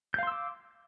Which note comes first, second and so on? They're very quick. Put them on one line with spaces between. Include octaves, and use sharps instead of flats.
G6 F5 C6 E6 D6